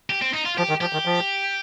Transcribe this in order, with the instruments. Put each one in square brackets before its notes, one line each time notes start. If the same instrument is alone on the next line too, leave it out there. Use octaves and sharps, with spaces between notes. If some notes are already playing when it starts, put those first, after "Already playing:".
[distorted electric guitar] G4
C4
D#4
F4
[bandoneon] F3 [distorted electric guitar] G4
[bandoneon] D#3
[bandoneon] F3 [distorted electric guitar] G4
[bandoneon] D#3
F3